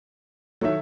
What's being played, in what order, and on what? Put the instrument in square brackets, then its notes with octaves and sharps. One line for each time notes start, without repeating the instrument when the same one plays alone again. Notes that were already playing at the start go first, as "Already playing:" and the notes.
[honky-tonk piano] D#3 F#3 [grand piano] A4 C#5 E5